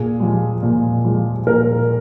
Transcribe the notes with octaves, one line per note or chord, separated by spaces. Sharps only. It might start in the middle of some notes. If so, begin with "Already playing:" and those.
Already playing: A#2 G#4
F3 G#3
A#2
F3 G#3
A#2 A#4